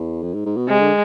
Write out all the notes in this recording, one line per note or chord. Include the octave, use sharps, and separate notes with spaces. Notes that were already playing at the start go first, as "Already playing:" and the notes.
Already playing: E2
F2
G#2
G#2
B2
C3 G#3
D3